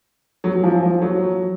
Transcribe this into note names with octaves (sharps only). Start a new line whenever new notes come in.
F#3
F3
F3
F#3